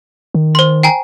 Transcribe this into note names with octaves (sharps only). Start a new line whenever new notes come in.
D#3
C5 C6
G5 G#5 A#5